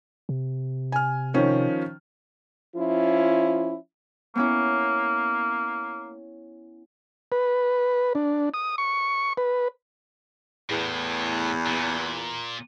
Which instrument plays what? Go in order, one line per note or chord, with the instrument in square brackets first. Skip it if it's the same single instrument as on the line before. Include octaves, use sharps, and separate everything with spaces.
[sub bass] C3
[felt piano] G#5 F6
D#3 F3 C#4
[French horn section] F3 C#4 E4 F4
[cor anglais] A#3 [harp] B3 C#4 E4
[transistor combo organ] B4
D4
D#6
C#6
B4
[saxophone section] E2 [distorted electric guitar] A2
[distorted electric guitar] A#2